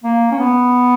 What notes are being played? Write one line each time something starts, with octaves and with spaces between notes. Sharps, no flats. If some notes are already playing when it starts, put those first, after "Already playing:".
A#3
C#4
B3